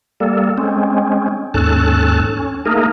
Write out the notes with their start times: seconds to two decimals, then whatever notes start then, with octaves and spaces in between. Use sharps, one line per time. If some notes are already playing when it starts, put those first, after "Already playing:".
0.20 G3 A#3 A4
0.58 G#3 C4 C#4
1.54 D#2 G#2 C#4 A4 A5 F#6
2.37 C#4
2.66 A3 A#3 D#4 G#4 A#4